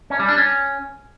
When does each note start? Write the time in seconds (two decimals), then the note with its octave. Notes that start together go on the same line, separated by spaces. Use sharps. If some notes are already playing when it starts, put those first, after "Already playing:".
0.10 C#4
0.19 G3
0.29 D4
0.38 C#4